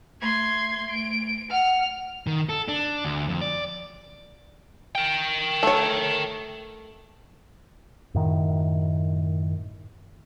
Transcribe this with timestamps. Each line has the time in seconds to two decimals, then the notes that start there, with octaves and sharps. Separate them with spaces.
0.21 A3 C6 G#6
0.90 D7
1.51 F#5 F6
2.27 D#3
2.49 A4
2.68 D4
3.05 D2
3.28 F2
3.41 D5
4.95 A#4 G5
5.63 A3 C#5
8.14 F#2 A2 D#3